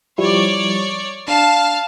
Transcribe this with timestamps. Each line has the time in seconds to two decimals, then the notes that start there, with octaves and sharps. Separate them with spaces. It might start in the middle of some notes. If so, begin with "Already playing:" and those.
0.18 F3 G3 E4 C#5 D5
1.28 D4 F5 A5